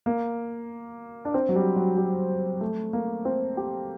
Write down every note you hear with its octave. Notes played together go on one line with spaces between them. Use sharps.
A#3
D4
C4
F#3
G3
F#3
G3
A3
A#3
C4
G4